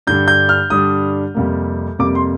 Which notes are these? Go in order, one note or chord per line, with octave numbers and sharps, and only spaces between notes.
G2 D3 G3 D4 G6
G6
F6
G2 D3 G3 D4 D#6
F2 C3 G3 A#3
F2 C3 G3 A#3 D6
C6